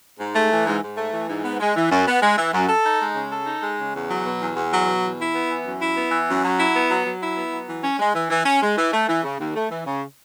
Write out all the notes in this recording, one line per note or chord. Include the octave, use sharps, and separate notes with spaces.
G#2
A3
E3
G#2
G#2
A3
E3
G#2
B3
G#3
E3
F#2
B3
G#3
E3
F#2
A4
D#4
G#3
C#3
A4
D#4
G#3
C#3
E2
F#3
B2
E2
E2
F#3
B2
E2
E4
B3
E3
F#2
E4
B3
E3
F#2
F#3
E4
B3
F#3
F#3
E4
B3
F#3
E3
C#4
G#3
E3
E3
C#4
G#3
E3
A3
E3
C#3
D#2
A3
E3
C#3